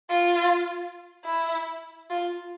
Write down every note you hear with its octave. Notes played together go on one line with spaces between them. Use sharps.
F4
E4
F4